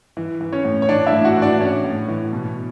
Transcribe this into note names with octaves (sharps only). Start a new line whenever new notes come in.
E3
E3
C#4 C#5
A2
C#5
E3 D4 D5
E4 E5
A2
F#4 F#5
E3
D4 D5
A2 C#4 C#5
A2
E3
B2